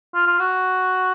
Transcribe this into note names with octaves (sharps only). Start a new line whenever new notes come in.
F4
F4
F#4